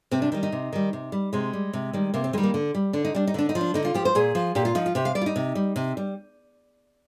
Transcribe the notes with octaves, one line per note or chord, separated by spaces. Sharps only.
C3 C4
D4
D#3 G3 D#4
D#4
C3
D#3 G3
C3
G3
C3 G#3
G3
C3
D#3 G3
C3 A#3
C4
D#3 G3 G#3
A#3
D3
G3
D3 D4
D#4
G3 D4
D#4
D3 D4
D#4
F3
D4
D3 D#4
F4
F3 G4
C5
A#2 G#4
F3
A#2 G4
F4
F3 D#4
F4
C3 G4
F5
G3 D5
F4
D#4
C3
G3
C3
G3